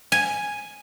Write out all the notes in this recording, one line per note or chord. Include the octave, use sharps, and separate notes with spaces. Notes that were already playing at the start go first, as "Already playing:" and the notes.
G#5